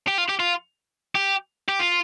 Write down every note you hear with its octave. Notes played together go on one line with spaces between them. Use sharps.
G4
F4
G4
F4
G4
G4
F4